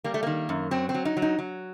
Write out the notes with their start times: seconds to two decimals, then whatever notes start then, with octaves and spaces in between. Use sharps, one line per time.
0.04 G3 A#3
0.14 A3
0.23 D#3 A#3
0.49 F#2
0.71 F#3 C4
0.89 C4
0.94 F#3
1.05 D#4
1.17 F#3
1.22 D#4
1.38 F#3